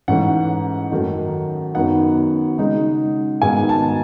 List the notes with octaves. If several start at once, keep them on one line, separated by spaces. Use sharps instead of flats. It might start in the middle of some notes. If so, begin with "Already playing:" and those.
G#2 E3 A3 C#4 F#5
F#2 D#3 A3 D#4
F#2 D#3 F#3 B3 D#4 F#5
C#3 G#3 D#4
G#2 D#3 G#3 B3 G#5
A5